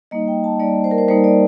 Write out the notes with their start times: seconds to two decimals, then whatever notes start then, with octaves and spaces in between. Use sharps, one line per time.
0.11 G3 A#3 D#4 D#5
0.28 G5
0.44 A5
0.60 G3 A#3 D#4 D5
0.84 C5
0.91 A#4
0.98 C5
1.08 G3 A#3 D#4 C5
1.24 D5